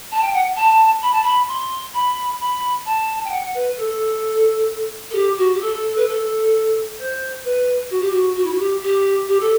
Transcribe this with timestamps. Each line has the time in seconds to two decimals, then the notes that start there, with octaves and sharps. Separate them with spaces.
0.11 A5
0.21 G5
0.33 F#5
0.56 A5
1.01 B5
1.12 A5
1.22 B5
1.47 C6
1.93 B5
2.39 B5
2.85 A5
3.24 G5
3.31 F#5
3.54 B4
3.77 A4
5.10 A4
5.14 G4
5.37 F#4
5.53 G4
5.60 A4
5.96 B4
6.06 A4
6.98 C5
7.44 B4
7.90 F#4
8.00 G4
8.10 F#4
8.35 F#4
8.44 E4
8.51 F#4
8.58 G4
8.82 G4
9.28 G4
9.39 A4